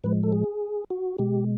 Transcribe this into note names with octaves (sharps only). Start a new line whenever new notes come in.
A2 F3 G#3 B4
A4
G#4
F#4
B2 G#3 G4